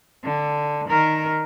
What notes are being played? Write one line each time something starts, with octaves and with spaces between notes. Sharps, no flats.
D3
D#3 A#4